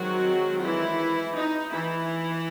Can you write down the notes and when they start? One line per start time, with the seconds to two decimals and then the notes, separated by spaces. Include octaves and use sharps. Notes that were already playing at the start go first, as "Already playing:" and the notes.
Already playing: D#3 F#3 G#3 C4 F#4
0.63 E3 E4
1.37 D#4
1.73 E3 E4